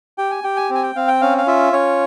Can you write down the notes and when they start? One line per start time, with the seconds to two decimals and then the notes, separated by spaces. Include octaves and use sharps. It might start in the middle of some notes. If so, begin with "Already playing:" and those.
0.18 G4 G5
0.31 G#5
0.44 G4 G5
0.57 G#5
0.70 C4 G#5
0.83 G5
0.96 C4 F5
1.08 G5
1.21 C#4 F5
1.38 F5
1.47 F4 E5
1.72 C#4 C#5